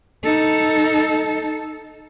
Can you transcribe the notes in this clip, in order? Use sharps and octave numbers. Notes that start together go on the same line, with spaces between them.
D#4 A4